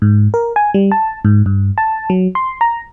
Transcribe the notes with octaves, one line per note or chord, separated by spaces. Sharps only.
G#2
A#4
G#5
G3
A5
G#2
G2
A5
F#3
C6
A#5